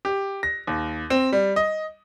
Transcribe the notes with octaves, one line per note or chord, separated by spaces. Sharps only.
G4
A#6
D#2
C4
G3
D#5